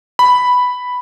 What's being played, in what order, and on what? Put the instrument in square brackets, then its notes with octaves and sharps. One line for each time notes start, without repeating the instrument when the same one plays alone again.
[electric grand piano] B5